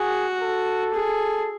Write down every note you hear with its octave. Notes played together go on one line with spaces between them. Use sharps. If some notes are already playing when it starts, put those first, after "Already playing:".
Already playing: F#4 G#4
A4
G#4